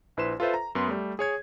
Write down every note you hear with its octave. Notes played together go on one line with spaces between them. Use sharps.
A#1 E4 B4 C5 C6 E7
F4 A4 B4 C5 E5
A#5
F#2 B3 C6
G3 A3
G#4 C#5 G#6